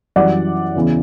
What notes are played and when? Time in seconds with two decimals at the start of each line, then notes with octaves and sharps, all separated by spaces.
0.16 F#2 E3 G3 D5 F#5
0.75 E2 C#3 E3